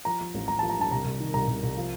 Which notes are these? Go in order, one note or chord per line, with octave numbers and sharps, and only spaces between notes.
F3 A#5
F3
A1
A1 A#5
F3 A5
A#5
G2 A5
C2 A#5
C2
D#3
C2 A#5
C2
C2
F3